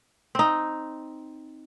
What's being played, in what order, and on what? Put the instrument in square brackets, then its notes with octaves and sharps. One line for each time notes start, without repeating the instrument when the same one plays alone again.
[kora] C4 D#4